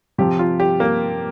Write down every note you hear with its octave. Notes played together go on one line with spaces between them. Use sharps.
C3 F3 G4
F4
G4
A#3